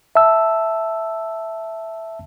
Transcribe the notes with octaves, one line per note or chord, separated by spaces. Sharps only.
E5 A5 E6